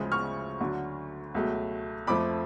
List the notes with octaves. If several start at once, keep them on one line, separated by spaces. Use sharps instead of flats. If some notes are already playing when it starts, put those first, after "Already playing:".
Already playing: D2 C#3 F3 G#3
C#6 F6
D2 D3 F#3
C#2 B2 F#3 A3
F2 F3 A3 B5 D6